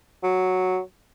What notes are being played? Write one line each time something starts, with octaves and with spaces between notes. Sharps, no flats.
F#3